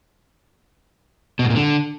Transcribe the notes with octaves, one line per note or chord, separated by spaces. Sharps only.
B2
G#2
A#2
D3